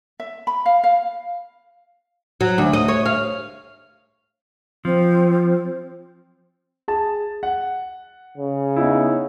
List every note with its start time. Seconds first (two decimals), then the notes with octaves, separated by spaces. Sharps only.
0.20 E5
0.47 B5
0.66 F5
0.84 F5
2.41 F#3
2.58 D2
2.73 D#5
2.88 C#5
3.06 F5
4.85 F3 C4
6.88 G#4 A5
7.43 F#5
8.37 C#3
8.76 B3 D#4 E4